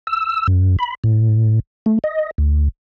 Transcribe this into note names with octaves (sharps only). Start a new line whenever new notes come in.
E6
F#2
B5
A2
A3
D#5
D2